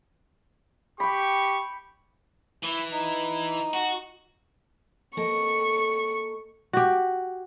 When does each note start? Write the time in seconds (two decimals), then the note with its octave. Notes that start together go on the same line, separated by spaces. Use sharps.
1.00 G4 G5 B5 C#6
2.64 E3 E4
2.93 D#4
3.74 F#4
5.17 A#3 A4 D#5 C#6
6.73 F#4 G4